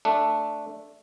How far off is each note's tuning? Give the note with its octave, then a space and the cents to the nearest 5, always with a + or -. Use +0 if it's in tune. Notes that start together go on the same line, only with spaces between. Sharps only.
A3 +0 D4 +0